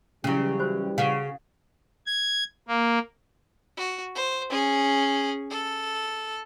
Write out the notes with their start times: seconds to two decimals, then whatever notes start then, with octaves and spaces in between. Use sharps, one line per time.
0.24 C#3 E3 F#3 G3 C#4 E4 G4
0.60 F#4 C5
0.98 C#3 F5 F#5
2.07 G#6
2.68 A#3
3.77 F#4
4.15 C5
4.50 C#4 G#4
5.51 A4